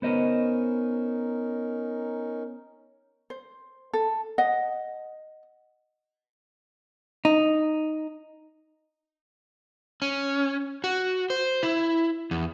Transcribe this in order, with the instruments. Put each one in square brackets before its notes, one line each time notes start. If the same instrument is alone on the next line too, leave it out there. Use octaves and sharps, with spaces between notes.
[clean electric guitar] B3 C5 D#5 [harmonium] C#4 D#4 A#4
[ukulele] C5
A4
D#5 F#5
[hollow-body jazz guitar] D#4
[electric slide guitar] C#4
F#4
C5
E4
E2